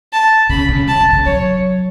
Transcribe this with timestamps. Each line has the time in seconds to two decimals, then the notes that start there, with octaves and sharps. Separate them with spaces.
0.13 A5
0.49 C#3 B5
0.69 C#3
0.87 F#3 A5
1.01 E3
1.13 C#3
1.25 F#3 C#5